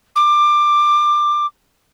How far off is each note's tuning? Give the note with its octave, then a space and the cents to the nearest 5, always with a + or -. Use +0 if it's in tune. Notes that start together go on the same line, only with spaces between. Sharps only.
D6 +20